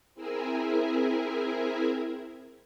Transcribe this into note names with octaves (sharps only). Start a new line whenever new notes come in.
C4 E4 G#4 A#4 E5 G#5